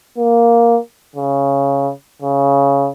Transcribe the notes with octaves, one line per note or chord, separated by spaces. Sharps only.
A#3
C#3
C#3